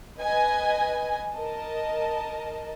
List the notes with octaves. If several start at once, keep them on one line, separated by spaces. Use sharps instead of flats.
B4 D#5 G#5
A#4 D#5 A5